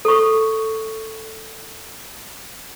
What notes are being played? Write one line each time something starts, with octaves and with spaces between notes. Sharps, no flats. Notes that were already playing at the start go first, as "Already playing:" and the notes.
A4 C#6